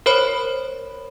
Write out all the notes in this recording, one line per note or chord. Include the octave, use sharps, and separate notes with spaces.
A#4 C5 C#5 B5